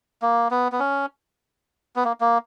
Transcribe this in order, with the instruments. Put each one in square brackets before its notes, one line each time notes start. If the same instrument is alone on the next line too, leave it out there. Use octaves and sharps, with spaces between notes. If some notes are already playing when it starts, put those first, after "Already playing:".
[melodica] A#3
B3
B3
C#4
B3
A#3
A#3